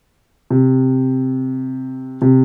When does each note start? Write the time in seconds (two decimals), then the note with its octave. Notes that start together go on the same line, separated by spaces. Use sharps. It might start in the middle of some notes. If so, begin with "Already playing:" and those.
0.50 C3
2.22 C3